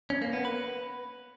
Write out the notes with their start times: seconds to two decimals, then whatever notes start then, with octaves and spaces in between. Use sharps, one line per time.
0.10 C#4
0.22 A#3
0.33 B3
0.45 B4